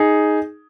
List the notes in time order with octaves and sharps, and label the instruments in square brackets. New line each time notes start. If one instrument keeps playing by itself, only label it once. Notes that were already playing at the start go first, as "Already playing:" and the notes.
Already playing: [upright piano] D#4 G#4